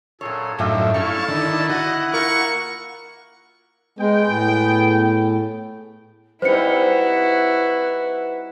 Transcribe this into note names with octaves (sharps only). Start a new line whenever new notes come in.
F#2 A#2 G#4 A4 C#5
F#2 A2 G3 D4 D#4 F4 E5
C#4 D4 E4 A4 F5 A5 C#6
D3 D#3 E4
F#4 D#5 F#5
A#3 F4 A#4 C#6
G#3 B3 G#4 G5
A2
G3 C4 D#4 E4 F#4 B4 C5 C#7